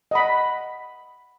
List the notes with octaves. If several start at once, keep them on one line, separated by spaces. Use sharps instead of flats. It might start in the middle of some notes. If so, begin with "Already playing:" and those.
D#5 F#5 B5